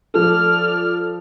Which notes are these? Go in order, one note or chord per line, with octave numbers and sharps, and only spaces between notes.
F3 A4 D5 F6